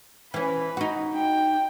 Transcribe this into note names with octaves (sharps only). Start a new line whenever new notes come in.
E3 C#4 B4
D#4 F#4
G5